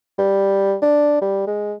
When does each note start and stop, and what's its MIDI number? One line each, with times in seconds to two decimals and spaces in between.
0.18 0.75 55
0.82 1.19 62
1.22 1.44 55
1.47 1.74 56